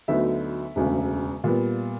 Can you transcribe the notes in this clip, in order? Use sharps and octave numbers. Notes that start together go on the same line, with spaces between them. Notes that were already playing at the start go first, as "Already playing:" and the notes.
D2 D3 F#3 B3 D#4 E5
E1 D2 C#3
A#2 G3 B3